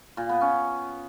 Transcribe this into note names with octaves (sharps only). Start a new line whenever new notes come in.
A#2
B3
C#4